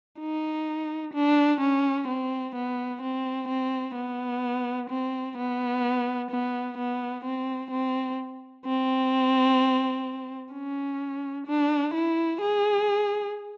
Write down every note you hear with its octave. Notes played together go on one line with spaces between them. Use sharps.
D#4
D4
C#4
C4
B3
C4
C4
B3
C4
B3
B3
B3
C4
C4
C4
C#4
D4
E4
G#4